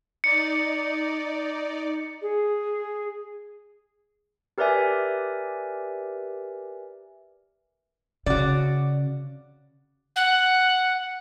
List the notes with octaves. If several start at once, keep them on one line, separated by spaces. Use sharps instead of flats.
D#4 D5 C#7
G#4
G4 A#4 B4 D5 E5 G#5
C#3 F#4 D5
F#5